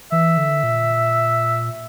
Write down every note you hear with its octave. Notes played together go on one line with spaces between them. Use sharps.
E3 E5
D3
A#2